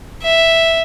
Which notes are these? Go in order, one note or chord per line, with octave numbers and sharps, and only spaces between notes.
E5